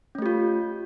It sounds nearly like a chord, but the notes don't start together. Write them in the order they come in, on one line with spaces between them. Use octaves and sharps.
C#4 A3 G4 F4